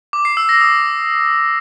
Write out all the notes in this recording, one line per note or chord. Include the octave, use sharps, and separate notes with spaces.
D6
C7
E6
A#6
D#6